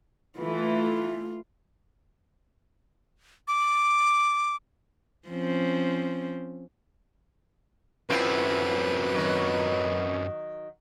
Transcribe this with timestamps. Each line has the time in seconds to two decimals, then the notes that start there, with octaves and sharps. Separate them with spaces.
0.39 E3 A3 F4
3.48 D6
5.28 F3 C4 C#4
8.10 F#2 C4 E4 F4 B4
9.14 D#3 F#3